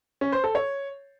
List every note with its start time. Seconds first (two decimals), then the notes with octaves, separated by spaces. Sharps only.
0.21 C#4
0.32 C5
0.44 A4
0.55 C#5